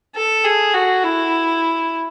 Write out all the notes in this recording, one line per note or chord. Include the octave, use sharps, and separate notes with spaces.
A4
G#4
F#4
E4